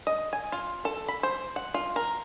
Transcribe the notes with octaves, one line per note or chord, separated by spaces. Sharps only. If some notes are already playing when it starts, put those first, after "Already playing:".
D#5
G#5
F4
A4
B5
C5
F#5
F4
A#4